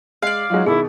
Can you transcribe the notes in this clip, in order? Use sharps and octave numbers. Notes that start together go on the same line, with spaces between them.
G#3 D5 F5
F#3 G#3 D#4 F4
B2 D#3 E4 G#4